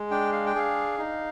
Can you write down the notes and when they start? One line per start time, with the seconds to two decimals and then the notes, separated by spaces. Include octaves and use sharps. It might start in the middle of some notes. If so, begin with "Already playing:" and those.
Already playing: G#3
0.11 D4 G5
0.33 F5
0.46 G5
0.55 G#4 F5
0.98 D#4